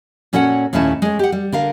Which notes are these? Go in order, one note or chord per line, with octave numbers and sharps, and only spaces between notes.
A#2 C#4 F#4 A4 C#5 F#5
D#2 A#2 A3 C#4 E4 A5
G#3 C#5
G4 F#5
G3
D3 A#4 F5